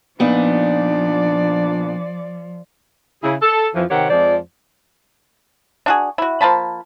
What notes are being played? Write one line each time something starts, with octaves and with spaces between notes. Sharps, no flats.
A#2 F3 B3 D4 D#4 D5
C#3 E4 G#4
A4
F2 E3 F3
C3 D#3 C4 G4 C#5 F#5
F2 F3 G#3 C5 D5
D4 F#4 G#4
E4 F#4
F3 A#3 A5 B5